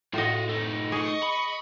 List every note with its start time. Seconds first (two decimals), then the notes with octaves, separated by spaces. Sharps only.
0.14 A2 F4 F#4 D#5
0.49 A3 D#4
0.92 G#4 D#5 C#6
1.23 B5